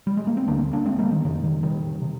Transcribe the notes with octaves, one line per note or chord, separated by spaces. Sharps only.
G3
G#3
A#3
C4
D2 D3 A#3 D4
A#3 D4
G#3 C4
G3 A#3
D#3
F2 C3 D#3
D#3
D#3 G3
C3